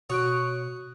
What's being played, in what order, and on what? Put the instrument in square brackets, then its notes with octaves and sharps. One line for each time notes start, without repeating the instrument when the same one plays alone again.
[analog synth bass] B2 [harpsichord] F#4 [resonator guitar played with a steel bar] C#5 [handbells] D#6 F#6 D7